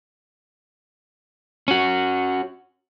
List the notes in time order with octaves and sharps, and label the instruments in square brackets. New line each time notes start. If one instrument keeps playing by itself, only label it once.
[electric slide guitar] C#4 F#4